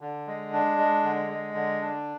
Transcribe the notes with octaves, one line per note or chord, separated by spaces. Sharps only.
D3
G#3
D4
G#3
D3
G#3
D3
D4